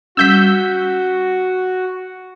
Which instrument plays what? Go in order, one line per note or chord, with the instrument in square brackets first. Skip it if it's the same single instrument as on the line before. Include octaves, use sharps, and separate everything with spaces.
[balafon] G3 C#4 [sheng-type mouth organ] F#4 [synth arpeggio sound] E6 G6 B6